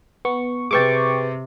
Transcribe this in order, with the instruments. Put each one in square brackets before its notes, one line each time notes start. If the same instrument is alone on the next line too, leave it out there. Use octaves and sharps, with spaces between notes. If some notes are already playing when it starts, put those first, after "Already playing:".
[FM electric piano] B3 C#6
[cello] C3 [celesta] G#4 B4 A6 [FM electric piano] G5 C#6 D6